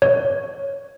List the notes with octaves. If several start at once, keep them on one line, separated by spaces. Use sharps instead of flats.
C#5